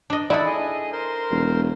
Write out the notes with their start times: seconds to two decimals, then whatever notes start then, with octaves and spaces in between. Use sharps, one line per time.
0.10 D4 D#5
0.30 D#4 E4 A4 D5 E5 F#5
0.46 G#4 D#5
0.92 A#4 C5 C6
1.31 E1